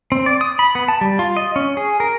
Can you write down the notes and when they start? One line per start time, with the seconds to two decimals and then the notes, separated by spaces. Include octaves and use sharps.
0.12 C4
0.26 D5
0.41 D#6
0.59 B5
0.75 B3
0.88 A5
1.01 G3
1.19 F4
1.37 D#5
1.56 C#4
1.77 G#4
2.00 A#4